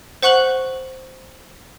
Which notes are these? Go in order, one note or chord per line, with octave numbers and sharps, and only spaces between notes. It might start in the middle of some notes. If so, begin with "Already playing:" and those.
C5 F#5 C#6 F#6 F#7